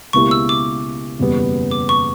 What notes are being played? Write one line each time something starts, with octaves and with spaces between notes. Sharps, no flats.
C#2 B2 A#3 E4 G4 C#6
E6
D6
F#1 E2 B2 G3 B3
D6
C#6